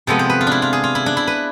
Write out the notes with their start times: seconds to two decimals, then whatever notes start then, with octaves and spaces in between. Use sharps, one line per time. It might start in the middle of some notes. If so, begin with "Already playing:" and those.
0.07 C3 F3 G#3 B3 A4
0.19 C5
0.30 B4
0.41 F4
0.47 D4 E4
0.62 F4
0.73 G#4
0.84 F4
0.95 E4
1.06 D4
1.17 E4
1.27 B4